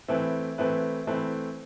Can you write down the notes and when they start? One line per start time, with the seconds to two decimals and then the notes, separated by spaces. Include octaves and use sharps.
0.08 E3 A3 C4 E4 B4
0.58 E3 A3 C4 E4 B4
1.07 E3 A3 C4 E4 B4